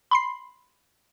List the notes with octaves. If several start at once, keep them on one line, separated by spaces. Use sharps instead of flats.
B5 C6 C7